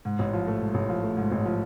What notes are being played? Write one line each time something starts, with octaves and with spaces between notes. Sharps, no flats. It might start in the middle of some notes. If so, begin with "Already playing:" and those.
G#2
A1
F3
A3
G#2
A1
F3
A3
G#2
A1
F3